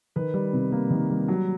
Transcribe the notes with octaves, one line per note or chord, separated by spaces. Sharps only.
D#3 B4
G3
C3
A#3
D#3
G3
F#3